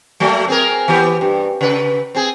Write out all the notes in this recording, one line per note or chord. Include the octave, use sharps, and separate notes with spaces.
F#3 A3 A#3
C4 G#4 A#4
E3 B3 G4
G2
C#3 B4
C4 G#4